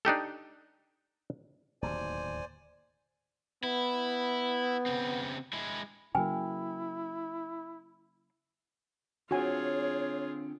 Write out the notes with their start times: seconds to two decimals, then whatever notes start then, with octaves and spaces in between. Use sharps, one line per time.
0.05 D4 D#4 G4 A4
1.82 D1 D#2 B2 C5 D5 G#5
3.63 B3 E4
4.86 C#3 C4
5.53 G#3 E4
6.15 C#3 F#3 A#3 E4 B4 G5 G#5
9.31 D3 C4 F4 F#4 G#4 C#5 G#5